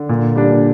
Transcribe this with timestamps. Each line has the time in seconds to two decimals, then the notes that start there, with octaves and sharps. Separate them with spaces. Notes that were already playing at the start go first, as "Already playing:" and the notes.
Already playing: D3
0.09 A#2
0.36 G3 D4
0.51 A#2